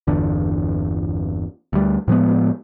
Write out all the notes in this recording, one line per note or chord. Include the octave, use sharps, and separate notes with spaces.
G1 E2 D3
D2 G3
A2 F3 G#3 B3